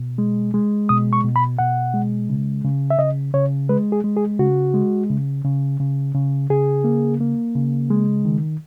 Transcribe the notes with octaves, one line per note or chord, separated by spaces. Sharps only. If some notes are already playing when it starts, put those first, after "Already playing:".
Already playing: B2
G#3
G#3
B2 D#6
C#6
B2
B5
B2 F#5
G#3
C#3
C#3
E5
C#3 D#5
C#3 C#5
G#3 B4
G#4
G#3
G#4
C#3 F#4
G#3
C#3
C#3
C#3
C#3
C#3 G#4
A#3
A#3
C#3
G#3
D#3